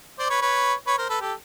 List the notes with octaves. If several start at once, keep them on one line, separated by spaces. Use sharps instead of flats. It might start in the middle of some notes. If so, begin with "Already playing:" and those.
C5 D5
B4 C#5
B4 C#5
B4 C#5
A#4 C5
A4 B4
G4 A4